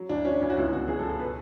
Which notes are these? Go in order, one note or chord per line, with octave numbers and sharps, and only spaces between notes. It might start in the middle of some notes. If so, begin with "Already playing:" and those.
Already playing: F#3
D2 D4
F#3 C#4
D2 C#4
F#4
C#2 E4
B2 F#4
F#3 G#4
A4
B2
A4
B4